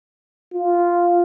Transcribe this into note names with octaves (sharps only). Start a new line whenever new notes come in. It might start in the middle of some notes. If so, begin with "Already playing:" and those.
F4